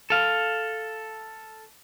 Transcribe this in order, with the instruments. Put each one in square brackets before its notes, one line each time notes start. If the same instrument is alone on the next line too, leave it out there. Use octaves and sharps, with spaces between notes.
[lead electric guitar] A4 F5